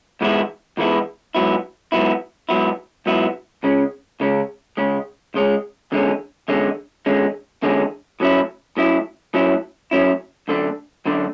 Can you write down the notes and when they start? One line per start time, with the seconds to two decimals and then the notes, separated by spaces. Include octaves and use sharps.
0.21 G#2 E3 G#3 B3 E4
0.77 G#2 E3 G#3 B3 E4
1.35 G#2 F#3 B3 E4
1.92 G#2 F#3 B3 E4
2.49 G#2 F#3 B3 E4
3.06 G#2 F#3 B3 E4
3.63 C#2 C#3 G#3 C#4
4.20 C#2 C#3 G#3 C#4
4.77 C#2 C#3 G#3 C#4
5.34 C#2 C#3 G#3 C#4
5.92 E2 D3 G#3 C#4
6.48 E2 D3 G#3 C#4
7.06 E2 D3 G#3 C#4
7.63 E2 D3 G#3 C#4
8.20 A2 F#3 C#4 E4
8.77 A2 F#3 C#4 E4
9.34 A2 F#3 C#4 E4
9.91 A2 F#3 C#4 E4
10.48 F#2 D3 A3 D4
11.06 F#2 D3 A3 D4